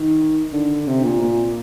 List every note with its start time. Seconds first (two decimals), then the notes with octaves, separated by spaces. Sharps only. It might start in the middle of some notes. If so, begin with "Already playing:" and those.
Already playing: D#3
0.53 D3
0.87 C3
1.04 A#2
1.22 A#2